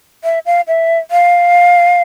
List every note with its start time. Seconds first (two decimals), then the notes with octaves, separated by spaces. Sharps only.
0.24 E5
0.46 F5
0.68 E5
1.11 F5